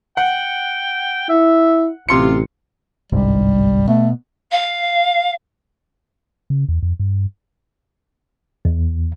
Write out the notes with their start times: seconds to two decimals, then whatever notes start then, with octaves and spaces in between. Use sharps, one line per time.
0.17 F#5 G5
1.29 E4 E5
2.09 A1 C3 F4 C6 C#7
3.12 G1 C2 G#2 G3
3.88 B2 A3
4.51 F5
6.50 C#3
6.69 E2
6.83 F2
7.00 G2
8.65 E2